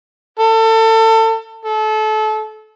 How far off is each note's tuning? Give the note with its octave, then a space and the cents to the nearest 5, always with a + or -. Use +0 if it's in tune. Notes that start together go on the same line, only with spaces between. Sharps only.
A4 +30
A4 -30